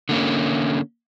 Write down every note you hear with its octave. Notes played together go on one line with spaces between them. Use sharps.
D3 A#3 C#4